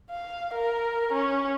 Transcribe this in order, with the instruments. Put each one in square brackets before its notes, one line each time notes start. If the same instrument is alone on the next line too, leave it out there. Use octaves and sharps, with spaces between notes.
[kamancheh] F5
A#4
C#4